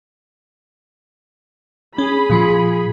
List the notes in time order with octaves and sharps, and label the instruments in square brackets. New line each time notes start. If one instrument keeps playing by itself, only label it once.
[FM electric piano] C#4 [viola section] G#4 B5
[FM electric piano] A#2 F3 F4